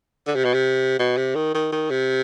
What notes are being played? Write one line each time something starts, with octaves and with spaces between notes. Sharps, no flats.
D3
C3
B2
C3
B2
C3
D#3
D#3
D#3
C3